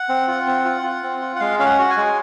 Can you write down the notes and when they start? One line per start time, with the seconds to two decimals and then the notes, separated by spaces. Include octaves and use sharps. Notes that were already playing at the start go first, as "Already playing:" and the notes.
Already playing: F#5
0.09 C4
0.28 F4
0.47 C4
0.65 F4
0.83 F4
1.03 C4
1.22 F4
1.36 F#5
1.40 G#3 F5
1.59 C#4 F5
1.65 F#5
1.78 F#4 F#5
1.91 G#5
1.97 G#3